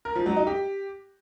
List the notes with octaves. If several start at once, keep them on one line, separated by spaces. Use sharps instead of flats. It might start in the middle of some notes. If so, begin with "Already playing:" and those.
A#4
F3
F#3
D#4
G4